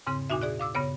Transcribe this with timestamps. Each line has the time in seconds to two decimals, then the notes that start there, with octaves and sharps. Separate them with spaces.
0.07 E2 G#2 C#3 C4 C6
0.29 E2 A#2 D#4 F#4 E5
0.41 G#4 D5 F#6
0.59 F5 D6 E6
0.75 G2 C#3 B3 C#5